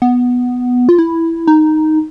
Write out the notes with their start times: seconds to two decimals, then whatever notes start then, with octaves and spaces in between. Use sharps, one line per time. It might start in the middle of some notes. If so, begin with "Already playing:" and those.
0.02 B3
0.89 F4
0.98 E4
1.47 D#4